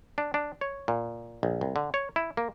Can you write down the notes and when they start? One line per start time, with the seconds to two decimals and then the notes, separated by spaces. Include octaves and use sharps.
0.18 D4
0.34 D4
0.61 C#5
0.88 A#2
1.43 A#1
1.61 C2
1.76 D3
1.94 C#5
2.16 E4
2.37 A#3